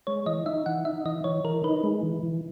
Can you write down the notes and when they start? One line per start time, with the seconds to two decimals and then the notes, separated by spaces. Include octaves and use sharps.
0.07 G#3 C#5
0.26 E3 D#5
0.46 D#4 E5
0.66 E3 F#5
0.85 D#4 E5
1.05 E3 D#5
1.24 E3 C#5
1.44 E3 A#4
1.64 D#4 B4
1.83 G#3
2.03 E3
2.23 E3